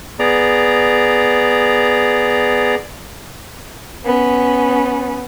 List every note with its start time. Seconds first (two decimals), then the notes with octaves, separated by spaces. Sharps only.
0.19 B3 G#4 D5 A#5
4.05 B3 C#4